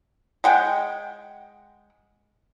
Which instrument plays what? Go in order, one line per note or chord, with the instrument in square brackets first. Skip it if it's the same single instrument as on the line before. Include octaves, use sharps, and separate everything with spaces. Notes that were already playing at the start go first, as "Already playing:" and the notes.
[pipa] G#3 F#5 G5